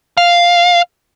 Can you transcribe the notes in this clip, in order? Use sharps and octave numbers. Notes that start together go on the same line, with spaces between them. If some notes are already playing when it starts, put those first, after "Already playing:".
F5